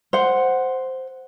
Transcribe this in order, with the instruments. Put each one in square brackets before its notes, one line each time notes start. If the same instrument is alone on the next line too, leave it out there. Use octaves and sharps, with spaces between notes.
[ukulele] C5 F#5